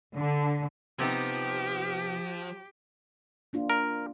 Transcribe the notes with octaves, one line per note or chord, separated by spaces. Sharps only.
D3
C3 F3 B3 D#4 G4
A#3 D4 F4
A#4